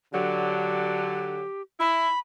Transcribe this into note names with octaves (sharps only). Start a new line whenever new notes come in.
D3 F#3 G4
E4 B5